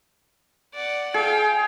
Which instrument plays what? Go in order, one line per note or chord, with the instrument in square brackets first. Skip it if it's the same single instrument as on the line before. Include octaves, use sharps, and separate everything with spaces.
[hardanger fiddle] D5 F#5
[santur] G#4 [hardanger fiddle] F5 G5